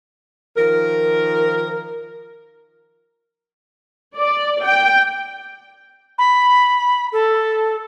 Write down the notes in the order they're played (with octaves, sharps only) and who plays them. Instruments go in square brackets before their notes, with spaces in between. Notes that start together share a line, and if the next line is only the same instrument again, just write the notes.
[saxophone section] D#3 F3 A#4
[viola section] D5
G5
[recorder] B5
A4